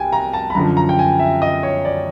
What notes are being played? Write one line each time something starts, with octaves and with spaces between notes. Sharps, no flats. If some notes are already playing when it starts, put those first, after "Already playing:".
Already playing: C2 G5 G#5
A#5
A5
B5
F#2 D3 F3 A#5
A#5
G5
G#5
E5
D#5
C#5
D5